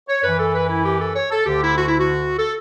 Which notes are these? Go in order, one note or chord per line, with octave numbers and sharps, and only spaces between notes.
C#5
F#2 E3 B4
A4
B4
E4
G4
A4
C#5
A4
D2 D3 G4
E4
F#4
E4
F#4
A4